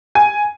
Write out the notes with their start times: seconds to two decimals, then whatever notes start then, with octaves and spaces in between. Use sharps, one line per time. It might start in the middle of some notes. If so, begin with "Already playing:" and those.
0.15 G#5